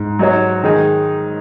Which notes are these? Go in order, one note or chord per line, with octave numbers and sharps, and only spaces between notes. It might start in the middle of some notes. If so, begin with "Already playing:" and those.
Already playing: G#2
F#3 D#4 F#4 C#5
D#3 G#3 D#4 G#4